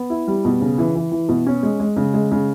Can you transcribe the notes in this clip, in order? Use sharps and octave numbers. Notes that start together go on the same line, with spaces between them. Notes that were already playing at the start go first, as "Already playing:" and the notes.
Already playing: B3
E4
G3
B2
C#3
E3
E3
E3
B2
C#4
G#3
G#3
C#3
G#3
C#3